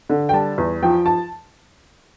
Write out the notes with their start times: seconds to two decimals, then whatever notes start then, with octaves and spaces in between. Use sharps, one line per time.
0.10 D3
0.29 G5
0.33 G3 A5
0.58 E2
0.83 F3 G5
1.06 A5